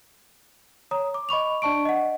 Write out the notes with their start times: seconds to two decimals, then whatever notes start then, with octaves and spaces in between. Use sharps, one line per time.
0.91 C#5 A#5 D#6
1.14 D6
1.29 D#5 B5 C#6 F7
1.62 D4 D5 A5 C#6 D7
1.85 D#5 F#5